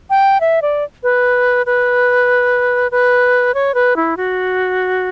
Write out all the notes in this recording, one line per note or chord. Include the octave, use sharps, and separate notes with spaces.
G5
E5
D5
B4
B4
B4
C#5
B4
E4
F#4